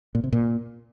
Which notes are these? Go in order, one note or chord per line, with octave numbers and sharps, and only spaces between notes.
A#2
C3
A#2